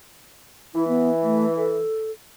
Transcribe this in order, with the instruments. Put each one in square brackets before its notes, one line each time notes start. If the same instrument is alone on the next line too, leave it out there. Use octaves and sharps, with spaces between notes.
[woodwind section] E3 [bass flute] E4
[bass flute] B3
A3
A4